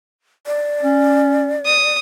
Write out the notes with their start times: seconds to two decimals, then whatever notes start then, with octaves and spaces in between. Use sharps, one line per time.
0.47 D5
0.83 C#4
1.65 D#6